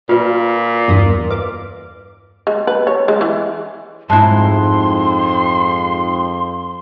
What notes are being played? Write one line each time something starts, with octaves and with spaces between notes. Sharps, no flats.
A#2 F4 B4 F5
E2 G2 D#6
B4 D6
G#3
B4
C#5
G#3
E3
F2 G#2 E4 A5 C6 F#6